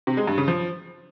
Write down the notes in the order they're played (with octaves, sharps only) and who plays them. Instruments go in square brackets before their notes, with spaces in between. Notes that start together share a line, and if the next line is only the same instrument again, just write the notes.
[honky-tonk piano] C3
G#3
G2
C#3
F3